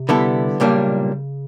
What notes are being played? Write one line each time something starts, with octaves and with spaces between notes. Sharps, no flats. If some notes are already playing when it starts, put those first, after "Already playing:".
Already playing: C3
D3 G3 B3 E4 A4
B1 A#2 C#3 G3 A#3 D4